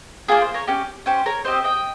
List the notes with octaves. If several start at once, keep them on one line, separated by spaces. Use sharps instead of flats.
A#3 F4 G#4 A#4
C5
A#4 C#5
C#4 G4
C#4 G4 C5
A#4 C#5
C4 G4 C5 D#5
D#5 G5